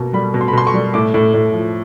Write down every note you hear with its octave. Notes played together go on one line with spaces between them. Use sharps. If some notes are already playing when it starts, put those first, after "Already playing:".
Already playing: B2 A#3
G3 B5
B2
C6
B5
B2 C6
C#6
G3
A2 D6
A2
A2
F3